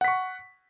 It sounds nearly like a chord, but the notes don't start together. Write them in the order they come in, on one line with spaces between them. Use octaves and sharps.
F#5 B6 C#6